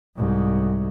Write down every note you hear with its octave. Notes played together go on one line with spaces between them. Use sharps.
C2 G#2